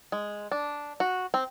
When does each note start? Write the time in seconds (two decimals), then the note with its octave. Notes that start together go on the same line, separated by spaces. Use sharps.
0.12 G#3
0.52 D4
1.00 F#4
1.34 C4